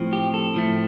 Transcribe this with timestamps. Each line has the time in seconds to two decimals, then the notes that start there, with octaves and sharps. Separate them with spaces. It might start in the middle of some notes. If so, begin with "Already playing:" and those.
Already playing: A2 F3 C4
0.13 G4
0.34 A4
0.54 A2 F3 A3